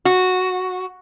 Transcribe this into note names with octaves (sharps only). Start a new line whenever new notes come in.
F#4